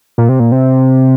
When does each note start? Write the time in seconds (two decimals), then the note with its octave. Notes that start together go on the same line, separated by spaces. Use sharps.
0.18 A#2
0.29 C3
0.40 A#2
0.52 C3